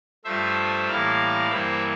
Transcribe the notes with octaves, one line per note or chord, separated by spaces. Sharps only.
G2 F3 A3 C5 E5
A2 E3 G3 A#3 D5 F5
G2 E3 G3 A#3 C5 E5